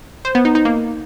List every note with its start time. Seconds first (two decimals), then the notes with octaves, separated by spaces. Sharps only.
0.25 C5
0.35 B3
0.45 D#4
0.55 D#4
0.65 A#3